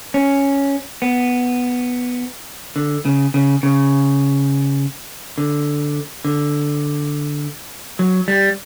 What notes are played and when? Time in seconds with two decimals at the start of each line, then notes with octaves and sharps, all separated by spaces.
0.14 C#4
1.02 B3
2.76 D3
3.05 C#3
3.34 C#3
3.63 C#3
5.38 D3
6.25 D3
7.99 F#3
8.28 G3